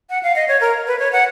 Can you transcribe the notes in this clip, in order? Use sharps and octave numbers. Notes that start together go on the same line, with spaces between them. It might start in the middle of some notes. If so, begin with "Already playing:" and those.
F#5
F5
D#5
C#5
A#4
B4
C#5
F#5